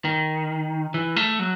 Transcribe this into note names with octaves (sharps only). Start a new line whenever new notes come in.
D#3
E3
A3
F#3